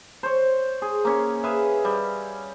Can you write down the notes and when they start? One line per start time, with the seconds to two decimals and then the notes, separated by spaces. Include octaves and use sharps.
0.23 C5 C#5
0.82 G#4
1.05 A#3 C#4
1.44 G#4 B4 E5 F5
1.85 G3